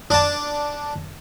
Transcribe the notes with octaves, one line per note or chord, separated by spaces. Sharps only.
D4 A5